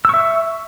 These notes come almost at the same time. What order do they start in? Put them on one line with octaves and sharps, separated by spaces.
E6 C#6 E5